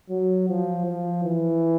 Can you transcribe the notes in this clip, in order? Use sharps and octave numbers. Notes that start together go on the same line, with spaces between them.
F#3
F3
F3
E3